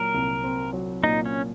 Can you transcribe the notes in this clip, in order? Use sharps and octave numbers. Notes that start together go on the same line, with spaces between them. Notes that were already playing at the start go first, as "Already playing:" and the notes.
Already playing: A#2 F#3 A#4
C2
C4
F#3
A#2 D#4
C#4